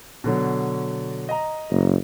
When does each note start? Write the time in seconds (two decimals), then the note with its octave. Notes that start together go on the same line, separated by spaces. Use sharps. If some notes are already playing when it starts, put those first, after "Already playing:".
0.24 B2 D3 F#3
1.29 D#5 A#5
1.70 F#1